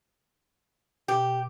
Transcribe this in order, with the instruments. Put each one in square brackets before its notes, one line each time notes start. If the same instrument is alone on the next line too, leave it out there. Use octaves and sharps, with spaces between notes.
[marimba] B2 [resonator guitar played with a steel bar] G4